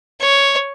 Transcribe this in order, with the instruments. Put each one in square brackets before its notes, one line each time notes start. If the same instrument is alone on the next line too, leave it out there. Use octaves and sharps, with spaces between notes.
[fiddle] C#5